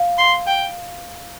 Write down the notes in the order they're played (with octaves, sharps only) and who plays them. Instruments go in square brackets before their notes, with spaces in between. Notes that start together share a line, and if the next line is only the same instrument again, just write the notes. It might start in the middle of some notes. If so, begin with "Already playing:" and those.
Already playing: [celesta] F5
[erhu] C6
G5